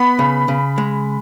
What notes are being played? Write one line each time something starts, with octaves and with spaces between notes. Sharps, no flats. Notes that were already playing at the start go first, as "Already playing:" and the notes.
Already playing: B3 B5
C#3
C#3
G#3